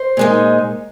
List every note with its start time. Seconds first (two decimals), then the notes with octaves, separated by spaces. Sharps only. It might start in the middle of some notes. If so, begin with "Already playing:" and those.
Already playing: C5
0.17 A#2 G#3 D#4